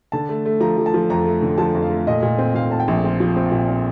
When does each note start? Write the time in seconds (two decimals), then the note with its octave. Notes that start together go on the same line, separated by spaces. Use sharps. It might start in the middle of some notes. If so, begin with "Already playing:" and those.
0.12 D3 A5
0.29 A3
0.46 A3
0.61 F3 A#5
0.77 F3
0.86 A5
0.94 F3
1.10 F2 A#5
1.26 A3
1.42 D3
1.58 F3 A5
1.75 F2
1.82 F5
1.90 A3
2.07 A#2 D#5
2.23 A#2
2.39 C4
2.55 A#2 F5
2.71 C4 A5
2.80 G5
2.88 A#1
3.04 C4
3.20 F3
3.36 C4
3.52 A#2
3.69 C4